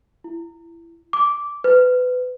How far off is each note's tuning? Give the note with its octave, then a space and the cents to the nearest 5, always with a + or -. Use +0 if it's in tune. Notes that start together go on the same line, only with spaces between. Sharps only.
E4 +25
D6 -10
B4 +25